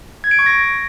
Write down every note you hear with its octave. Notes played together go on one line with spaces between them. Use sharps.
G#6
D7
C#6
A#6